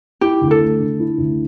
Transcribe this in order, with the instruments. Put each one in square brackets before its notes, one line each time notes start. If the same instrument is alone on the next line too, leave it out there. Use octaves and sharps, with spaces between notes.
[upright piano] E4 [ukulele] G4
[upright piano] D2
[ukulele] A4
[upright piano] A3
D3
E4
D2